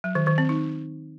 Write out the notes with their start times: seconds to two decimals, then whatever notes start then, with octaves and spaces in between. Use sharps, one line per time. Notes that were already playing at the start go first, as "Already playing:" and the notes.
0.04 F#3
0.15 D#3
0.27 D#3
0.38 C4
0.49 D#4